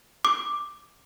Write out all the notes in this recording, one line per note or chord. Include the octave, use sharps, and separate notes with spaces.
D6